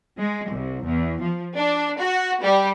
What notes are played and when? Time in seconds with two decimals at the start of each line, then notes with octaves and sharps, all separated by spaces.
0.18 G#3
0.51 C2
0.84 E2
1.21 F3
1.56 D4
1.98 F#4
2.42 G3